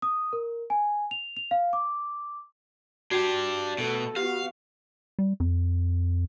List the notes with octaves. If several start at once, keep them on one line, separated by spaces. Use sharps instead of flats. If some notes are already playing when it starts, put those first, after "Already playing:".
D#6
A#4
G#5
F7
F7
F5
D6
D4 F#4 G4 G#6 C7
B2 A3 A4
B3 F#4 G4 F5
G3
F2